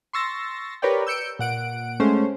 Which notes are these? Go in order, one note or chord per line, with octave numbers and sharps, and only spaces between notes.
C6 C#6 E6 A6 A#6
G4 A#4 B4 C#5 D5 G5
E6 G6 C#7 D7
A#2 F#5 D7
G#3 A3 C#4 C5